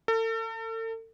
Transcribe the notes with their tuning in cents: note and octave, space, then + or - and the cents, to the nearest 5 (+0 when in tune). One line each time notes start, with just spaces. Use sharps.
A4 +40